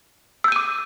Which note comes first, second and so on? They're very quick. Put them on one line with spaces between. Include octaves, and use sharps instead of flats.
E6 G6 D#7 D6